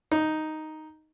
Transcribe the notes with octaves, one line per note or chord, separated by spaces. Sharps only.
D#4